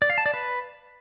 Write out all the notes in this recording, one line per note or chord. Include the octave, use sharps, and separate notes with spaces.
D5
F5
A5
D5
B4